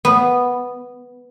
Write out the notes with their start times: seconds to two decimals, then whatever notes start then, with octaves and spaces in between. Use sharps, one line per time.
0.05 B3